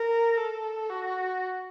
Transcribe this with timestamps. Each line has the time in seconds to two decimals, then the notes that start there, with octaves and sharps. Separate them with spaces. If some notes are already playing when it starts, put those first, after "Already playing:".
Already playing: A#4
0.37 A4
0.90 F#4